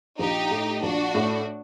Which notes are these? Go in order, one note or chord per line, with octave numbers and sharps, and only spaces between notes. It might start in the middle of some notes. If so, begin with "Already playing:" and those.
A#1 D#4 G4
A2 A3
A#1 D4 F#4
A2 A3